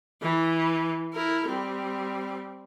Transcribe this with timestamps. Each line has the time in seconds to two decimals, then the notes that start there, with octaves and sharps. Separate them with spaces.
0.22 E3
1.13 E4 A#4
1.48 G3 C4